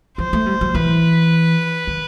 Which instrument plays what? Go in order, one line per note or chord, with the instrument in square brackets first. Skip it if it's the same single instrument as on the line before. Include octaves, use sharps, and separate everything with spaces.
[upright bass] F3 [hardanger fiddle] C5
[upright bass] A3
G3
F#3
[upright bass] E3 [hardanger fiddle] B4
[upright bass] D#3